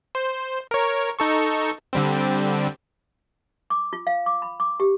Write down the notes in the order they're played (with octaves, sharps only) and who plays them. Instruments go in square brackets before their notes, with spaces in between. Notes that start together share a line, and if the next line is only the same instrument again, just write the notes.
[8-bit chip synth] C5
A#4 C#5
D#4 A4 C#6
D3 G3 C4
[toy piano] D6
F4
F5
D6
B5
D6
G4